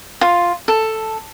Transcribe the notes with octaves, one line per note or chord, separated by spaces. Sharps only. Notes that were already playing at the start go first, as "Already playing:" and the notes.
F4
A4